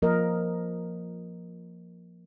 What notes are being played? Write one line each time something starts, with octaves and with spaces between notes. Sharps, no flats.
F3 A#3 A#4 D#5